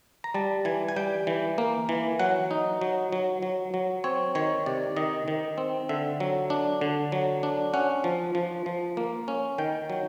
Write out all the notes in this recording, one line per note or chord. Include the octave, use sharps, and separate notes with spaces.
A#5
G3 A5
E3 G#5
G#5
G3 G5
E3
A#3
E3
F#3 F#5
D#4
F#3
F#3
F#3
F#3
C4 C#5
D#3 C#5
C3 D5
D#3 D#5
D#3
C4
D3 E5
F#3
D4
D3
F#3
D4
C#4 F#5
F3
F3
F3
A#3
C#4
D#3 G5
F#3